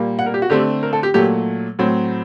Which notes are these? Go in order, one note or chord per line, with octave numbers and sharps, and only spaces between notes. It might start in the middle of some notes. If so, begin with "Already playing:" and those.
Already playing: A#2 G3 A#3
F#5
A#4
G4
F#4
D3 A3 C4 G4
A#4
A4
G4
A#2 F#3 A3 G4
A2 F#3 C4